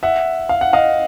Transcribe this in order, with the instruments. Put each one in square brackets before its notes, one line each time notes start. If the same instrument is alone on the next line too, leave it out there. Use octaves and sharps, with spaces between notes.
[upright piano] E5 F#5
F5
F#5
D#5 F5